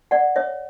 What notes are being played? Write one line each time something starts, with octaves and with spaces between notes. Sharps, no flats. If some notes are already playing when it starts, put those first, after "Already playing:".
D5 F#5
C#5 E5